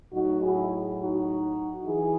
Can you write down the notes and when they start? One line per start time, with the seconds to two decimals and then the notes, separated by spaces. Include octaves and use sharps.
0.13 A2 F#3 D#4 F#4
0.42 E4 G#4
0.99 D#4 F#4
1.86 E3 E4 G#4